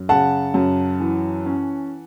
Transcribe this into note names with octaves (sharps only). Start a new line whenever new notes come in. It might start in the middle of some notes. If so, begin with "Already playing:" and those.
Already playing: F#2
C#3 F#5 A5
F#2
E3
C#4